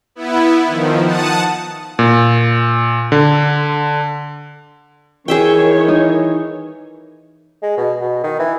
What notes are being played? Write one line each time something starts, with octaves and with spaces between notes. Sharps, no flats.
B3 E4
D#3 F3
F#5 A5 D#6
A#2
D3
D#3 E3 G#4 C#5 E5 G5
D#4
G#3
B2
B2
D#3
E3